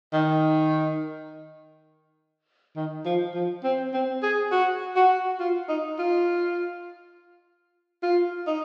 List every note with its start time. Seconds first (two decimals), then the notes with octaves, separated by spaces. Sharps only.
0.13 D#3
2.76 D#3
3.05 F3
3.35 F3
3.64 C4
3.94 C4
4.23 G#4
4.52 F#4
4.96 F#4
5.40 F4
5.69 D#4
5.99 F4
8.03 F4
8.47 D#4